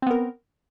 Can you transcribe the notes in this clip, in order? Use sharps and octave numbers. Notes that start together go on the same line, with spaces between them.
B3 C4 A#4